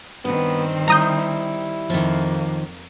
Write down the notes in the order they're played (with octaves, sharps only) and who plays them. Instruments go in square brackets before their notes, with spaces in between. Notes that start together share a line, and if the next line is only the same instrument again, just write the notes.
[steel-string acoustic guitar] G2 [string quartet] D#3 C4 [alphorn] B3
[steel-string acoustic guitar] G3 [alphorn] E4 [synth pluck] A#5 D#6 G6
[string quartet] F2 A#3 [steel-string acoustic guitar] D#3 F3